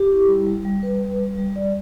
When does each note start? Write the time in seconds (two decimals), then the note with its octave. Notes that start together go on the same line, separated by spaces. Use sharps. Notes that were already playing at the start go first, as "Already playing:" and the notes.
Already playing: G4
0.11 E4
0.28 G3
0.47 G3
0.65 G3
0.83 B4
1.01 G3
1.20 G3
1.38 G3
1.56 D5